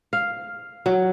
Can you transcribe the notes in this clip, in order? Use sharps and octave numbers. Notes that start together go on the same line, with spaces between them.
F5
F#3